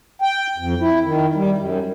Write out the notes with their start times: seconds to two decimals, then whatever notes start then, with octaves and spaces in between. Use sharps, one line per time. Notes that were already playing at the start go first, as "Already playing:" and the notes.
0.22 G5
0.58 F2
0.80 E4
1.04 D#3
1.35 G3
1.58 F#2